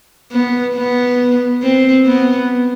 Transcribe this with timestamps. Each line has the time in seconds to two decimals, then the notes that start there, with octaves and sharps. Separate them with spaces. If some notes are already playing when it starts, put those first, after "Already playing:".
0.32 B3
0.75 B3
1.62 C4
2.06 B3